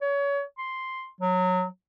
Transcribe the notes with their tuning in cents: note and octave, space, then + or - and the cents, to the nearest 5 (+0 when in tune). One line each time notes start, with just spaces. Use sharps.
C#5 +30
C6 +0
F#3 -15